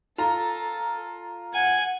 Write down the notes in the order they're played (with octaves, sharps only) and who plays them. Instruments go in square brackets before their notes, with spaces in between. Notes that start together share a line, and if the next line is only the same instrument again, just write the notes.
[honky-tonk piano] F4 A#5 [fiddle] A4
[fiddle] F#5 [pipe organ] G#5